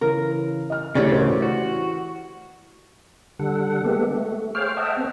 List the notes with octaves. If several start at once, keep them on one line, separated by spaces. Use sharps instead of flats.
C#3 E3 A#4
D#5 F6
D2 A2 C#3 E3 A3 G4 C#5 D5
F#4 A#4 C5
E3 F#4
D3 G3 A4 F#5
G#3 A#3 B3 G4 A4
A3
G#4 C5 C#5 F5 G5 F6
D#5 E5 F#5 G5 A5
B3 C4